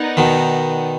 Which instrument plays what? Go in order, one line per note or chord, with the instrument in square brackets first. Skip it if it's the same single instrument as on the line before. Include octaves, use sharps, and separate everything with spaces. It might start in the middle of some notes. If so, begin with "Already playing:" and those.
Already playing: [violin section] B3 D#4 A#4 D5 F#5
[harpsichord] B2 D#3